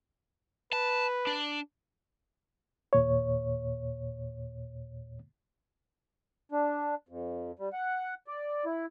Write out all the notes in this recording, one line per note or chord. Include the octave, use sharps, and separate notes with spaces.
B4 A5
D4
D#2 A#2 C#5
D4
F2
G3
F#5
D5
E4